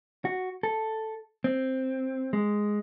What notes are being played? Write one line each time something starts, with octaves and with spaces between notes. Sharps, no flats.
F#4
A4
C4
G#3